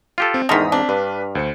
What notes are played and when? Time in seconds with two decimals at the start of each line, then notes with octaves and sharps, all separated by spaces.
0.18 F4 G4 A4
0.34 C4
0.49 E2 G#2 D3 D#3 A#5 D#6 F6 B6
0.72 C4 D4
0.89 G2 B4
1.35 D2 C5 C#7